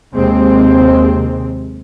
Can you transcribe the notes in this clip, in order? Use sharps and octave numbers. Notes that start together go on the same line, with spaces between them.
D#2 C3 G#3 C4